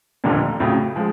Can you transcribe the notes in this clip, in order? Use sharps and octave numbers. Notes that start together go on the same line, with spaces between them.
F1 D#2 A#2 D3 F3
F2 A2 C#3 F#3
F3 G#3